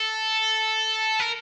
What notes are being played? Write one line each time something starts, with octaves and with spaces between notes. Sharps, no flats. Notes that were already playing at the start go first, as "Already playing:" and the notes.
Already playing: A4
A#4